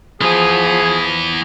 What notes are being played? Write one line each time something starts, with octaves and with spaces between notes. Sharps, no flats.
E3 F3 B3 G#4